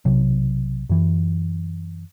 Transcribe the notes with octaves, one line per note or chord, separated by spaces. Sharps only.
B1 C3 F#3
F#2 E3